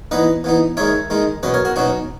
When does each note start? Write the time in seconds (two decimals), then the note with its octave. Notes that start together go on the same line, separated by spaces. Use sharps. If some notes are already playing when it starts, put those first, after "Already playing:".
0.11 E3 B3 D#4 B4 D#5
0.44 E3 B3 D#4
0.77 D#3 G#3 D#4 C#5 E5
1.10 D#3 G#3 D#4
1.43 B2 F#3 C#4 B4 D#5
1.54 A#4 C#5
1.65 F#4 A#4
1.76 B2 F#3 C#4 D#4 F#4